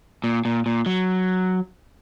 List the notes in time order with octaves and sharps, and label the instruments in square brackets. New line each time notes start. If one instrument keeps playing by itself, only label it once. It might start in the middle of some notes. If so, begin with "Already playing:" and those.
[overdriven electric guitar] A#2
A#2
A#2
F#3